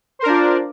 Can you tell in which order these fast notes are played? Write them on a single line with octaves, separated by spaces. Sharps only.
C5 A#4 D4 F4 D5